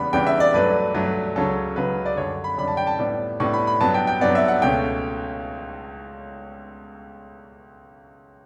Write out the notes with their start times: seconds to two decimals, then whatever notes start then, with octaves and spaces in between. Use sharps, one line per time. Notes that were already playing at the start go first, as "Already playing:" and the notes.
Already playing: E2 C#3 G3 B3 D4 B5
0.13 E2 C#3 G3 B3 D4 G5
0.27 E5
0.40 D5
0.54 G2 F#3 A3 D4 B4
0.95 G2 F#3 A3 D4
1.36 C#2 C#3 F#3 C#4 A4
1.76 C#2 C#3 F#3 C#4 B4
2.06 D5
2.17 F#2 D3 G3 D4 C#5
2.44 B5
2.58 F#2 D3 G3 D4 B5
2.68 A5
2.77 G5
2.87 A5
2.99 A2 G3 B3 D4
3.40 A2 G3 B3 D4 C#6
3.54 B5
3.67 B5
3.81 G2 F#3 B3 A5
3.94 G5
4.07 G5
4.21 G2 F#3 B3 D5
4.35 E5
4.48 F#5
4.62 C#2 B2 A3 C#4 G5